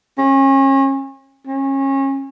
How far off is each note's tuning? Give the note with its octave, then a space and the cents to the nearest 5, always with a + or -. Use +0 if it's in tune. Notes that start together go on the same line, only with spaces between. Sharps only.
C#4 -35
C#4 -30